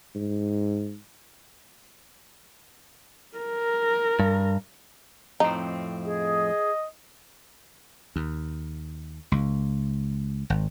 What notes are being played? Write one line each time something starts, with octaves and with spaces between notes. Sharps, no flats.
G#2
A#4
G2
F2 A2 C4 D#4
G#4 D#5
D#2
C#2
G#1